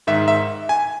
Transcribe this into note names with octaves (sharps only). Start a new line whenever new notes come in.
G#2 D#3 E5
E5
G#5